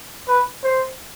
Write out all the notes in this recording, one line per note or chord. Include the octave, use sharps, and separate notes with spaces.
B4
C5